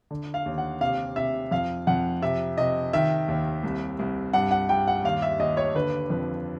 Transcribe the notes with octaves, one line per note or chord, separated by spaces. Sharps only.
D3
F5
D#2
F#5
C3 F5
C3 E5
F2 F5
F2 F#5
C3 E5
C3 D#5
D#3 E5
D#2
C2
C2
G2 F#5
F#5
G2 G5
F#5
D#2 F5
E5
D#2 D#5
C#5
D3 B4
F2 B4